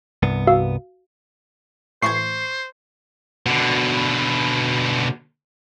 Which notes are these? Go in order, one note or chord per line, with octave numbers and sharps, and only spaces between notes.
C2 G2 B3
F#4 F5 E6
A2 E3 C5 C#6 G#6 C7
B2 D3